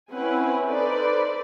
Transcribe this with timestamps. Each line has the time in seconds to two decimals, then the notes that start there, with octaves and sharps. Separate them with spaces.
0.12 C4 C#4 E4 B4 F#5 G#5
0.67 D#4 A4 B4 C5 D5